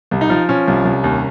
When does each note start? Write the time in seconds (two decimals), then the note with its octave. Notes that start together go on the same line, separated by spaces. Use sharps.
0.11 C2
0.21 D#4
0.30 F3
0.49 F3 C#4
0.68 C2
0.85 C2
1.04 D#2